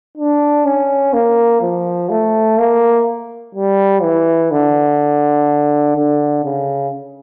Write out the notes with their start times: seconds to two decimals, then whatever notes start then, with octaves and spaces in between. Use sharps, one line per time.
0.17 D4
0.65 C#4
1.13 A#3
1.61 F3
2.10 A3
2.58 A#3
3.55 G3
4.03 E3
4.51 D3
5.96 D3
6.44 C#3